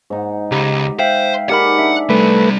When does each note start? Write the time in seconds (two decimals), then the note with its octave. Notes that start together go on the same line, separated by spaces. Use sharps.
0.10 G#2 D#4 F#5
0.52 C#2 G4 A#5
0.99 C5 E5 F5 G5
1.50 D#4 G4 G#4 A#4 D5 F#5 B5
1.79 D4 E5
2.09 C2 G3 A3 B4